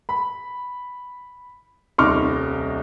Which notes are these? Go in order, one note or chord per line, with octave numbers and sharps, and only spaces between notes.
B5
D#1 C2 D#4 C#6 D6 F6